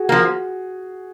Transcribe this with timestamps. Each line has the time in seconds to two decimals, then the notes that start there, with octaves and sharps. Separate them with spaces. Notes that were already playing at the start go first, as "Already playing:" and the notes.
Already playing: F#4 G#4
0.09 F3 A#3